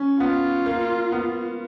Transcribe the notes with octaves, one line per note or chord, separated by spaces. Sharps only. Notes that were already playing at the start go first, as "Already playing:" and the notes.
Already playing: C#4
B3 F4
A#3
B3